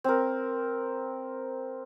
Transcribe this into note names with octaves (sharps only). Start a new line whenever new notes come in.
C4 A#4